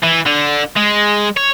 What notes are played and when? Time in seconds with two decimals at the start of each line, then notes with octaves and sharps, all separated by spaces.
0.03 E3
0.26 D3
0.76 G#3
1.37 C#5